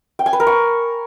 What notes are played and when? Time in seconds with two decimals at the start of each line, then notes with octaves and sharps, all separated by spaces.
0.19 G5
0.26 G#5
0.33 B4
0.40 A#4
0.47 C#6